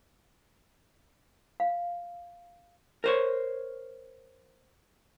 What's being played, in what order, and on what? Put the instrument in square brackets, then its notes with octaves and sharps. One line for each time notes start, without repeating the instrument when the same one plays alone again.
[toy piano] F5
[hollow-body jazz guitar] A#4 C5 C#5